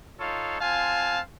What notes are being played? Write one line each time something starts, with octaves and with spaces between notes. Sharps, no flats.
D#4 F4 A4 C#5 F5
C4 F4 F5 G#5 A5